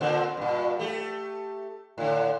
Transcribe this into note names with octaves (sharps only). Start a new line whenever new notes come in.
A#2 D3 C4
G2 A#2
A3 G4
A2 D3